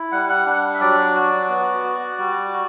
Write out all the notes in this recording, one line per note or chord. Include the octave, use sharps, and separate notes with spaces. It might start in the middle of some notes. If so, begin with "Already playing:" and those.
Already playing: E4
G3 F#5
F#5
D4 F#5
E5
F#3 D5
F#4
B3
F#4
G3
F#4